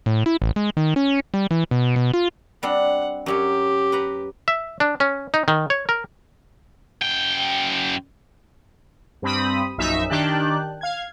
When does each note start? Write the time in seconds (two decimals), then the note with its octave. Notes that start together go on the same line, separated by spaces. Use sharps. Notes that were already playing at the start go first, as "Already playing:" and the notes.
0.06 A2
0.26 E4
0.42 A1
0.56 G#3
0.77 D#3
0.96 C#4
1.34 G3
1.51 E3
1.71 B2
1.96 B2
2.14 F4
2.63 G3 C4 D4 F#5
3.26 F#2 F#3 C#4 G4
3.92 B4 F#5 A#5
4.48 E5
4.80 D4
5.00 C#4
5.34 D#4
5.48 D#3
5.70 C#5
5.89 A#4
7.02 F#2 G5
9.22 G2 C4 B5 D#6
9.78 A#1 F#2 D#4 E5
10.10 D#3 D4 G4 G5 A5 F#6
10.81 F5 G#6